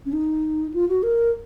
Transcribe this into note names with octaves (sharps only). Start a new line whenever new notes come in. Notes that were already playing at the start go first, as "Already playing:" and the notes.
C#4
D#4
F4
F#4
A#4